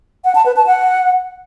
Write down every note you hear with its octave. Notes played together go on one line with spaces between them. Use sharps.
F#5
A5
B4
A5
F#5